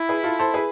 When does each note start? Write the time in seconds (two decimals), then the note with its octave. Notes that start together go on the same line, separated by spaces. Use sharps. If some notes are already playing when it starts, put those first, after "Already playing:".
Already playing: E4
0.09 G#4 B4
0.24 F4 A4
0.39 A4 C5
0.54 G#4 B4